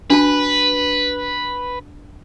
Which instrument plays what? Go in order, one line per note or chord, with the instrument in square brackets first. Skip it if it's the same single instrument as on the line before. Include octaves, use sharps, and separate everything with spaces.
[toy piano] D4 F#4 A5 [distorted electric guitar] B4